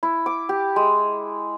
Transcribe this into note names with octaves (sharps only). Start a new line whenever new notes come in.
E4
D6
G4
G#3